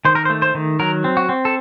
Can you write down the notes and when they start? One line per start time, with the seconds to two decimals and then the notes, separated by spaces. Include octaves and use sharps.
0.05 D#3 C5
0.15 A#4
0.25 C5
0.30 A3
0.42 C5
0.55 D#3
0.80 F#3 A#4
1.04 C4
1.17 F#4
1.29 C4
1.45 A4